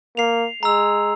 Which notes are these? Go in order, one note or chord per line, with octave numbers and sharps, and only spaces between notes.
A#3 C7 F7
G#3 A#5 E6